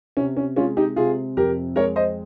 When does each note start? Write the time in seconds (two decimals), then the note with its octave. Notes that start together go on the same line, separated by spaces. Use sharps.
0.17 C3 C#4
0.37 C#4
0.56 G#3 C#4 F4
0.77 D#4 G4
0.96 C3 F4 G#4
1.37 F2 G4 A#4
1.76 G#3 A#4 C#5
1.96 C5 D#5